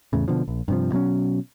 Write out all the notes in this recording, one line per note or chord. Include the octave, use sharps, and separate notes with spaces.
E2 A2 C#3
B2 D3 F3
A#1
G2 C3 F3
B2 F#3 C4 C#4